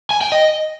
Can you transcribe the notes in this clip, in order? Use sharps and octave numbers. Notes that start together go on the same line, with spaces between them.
G#5
G5
D#5